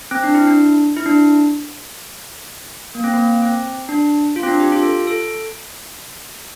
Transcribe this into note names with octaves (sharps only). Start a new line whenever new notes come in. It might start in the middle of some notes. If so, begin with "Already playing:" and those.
C4
D4
E4
D4
E4
D4
A#3
C4
A#3
C4
D4
F4
C4
D4
G4
F4
A4
A4